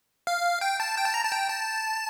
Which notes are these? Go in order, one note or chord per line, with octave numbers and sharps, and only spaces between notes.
F5
G5
A5
G5
A5
A#5
A5
G5
A5